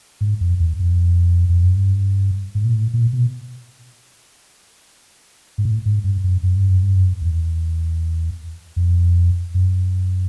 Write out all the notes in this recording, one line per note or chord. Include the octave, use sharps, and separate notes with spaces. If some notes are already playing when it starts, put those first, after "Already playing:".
G#2
F2
E2
F2
F2
F#2
G2
G#2
A#2
A2
A#2
B2
G#2
A2
G#2
G2
F#2
F#2
G2
F#2
G2
F#2
E2
F2
F#2